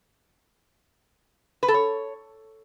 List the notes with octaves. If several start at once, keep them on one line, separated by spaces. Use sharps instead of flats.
B4
A4
C#5